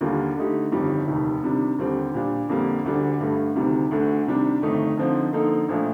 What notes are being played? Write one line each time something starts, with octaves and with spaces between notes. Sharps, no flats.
D#2 D3 G3 A#3 F4
D3 A3 D#4 G4
G1 F2 D#3 G3
F1 D#2 D#3
C3 D#3 G3 D4
D#2 D3 G3 C4
A#2 G3 D4
F2 D3 G3 A#3
D2 D3 G3 D4
G2 D3 A3
D2 C3 D#3 G3
D2 D3 A3
C3 D#3 G3 D4
G1 F2 D#3 A3 D#4
D3 F3 C4 D#4
D3 F3 A#3 D#4 A4
A#1 A#2 F3 A3 D4